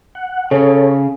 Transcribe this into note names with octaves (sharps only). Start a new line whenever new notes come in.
F#5
C#3 A4 C#5